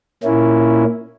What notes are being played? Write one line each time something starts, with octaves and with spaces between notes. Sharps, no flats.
A#2 A#3 C#4 E4